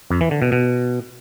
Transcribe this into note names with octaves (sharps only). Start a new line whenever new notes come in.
F2
E3
D3
B2
B2